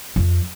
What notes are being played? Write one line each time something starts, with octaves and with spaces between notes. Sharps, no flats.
F2